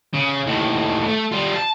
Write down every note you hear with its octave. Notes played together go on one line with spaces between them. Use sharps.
C#3
D#2 A2
A3
G3 F4
A5